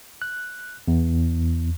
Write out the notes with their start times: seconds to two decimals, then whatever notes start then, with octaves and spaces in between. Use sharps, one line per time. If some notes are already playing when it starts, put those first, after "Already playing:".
0.22 F#6
0.88 E2